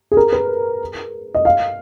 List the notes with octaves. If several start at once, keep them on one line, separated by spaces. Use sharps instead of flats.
G#4
A#4
B4
D#5
F5